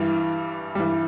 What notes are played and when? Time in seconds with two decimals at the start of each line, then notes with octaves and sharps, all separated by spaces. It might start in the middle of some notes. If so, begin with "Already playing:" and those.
Already playing: G2 E3 G3
0.75 G2 E3 G3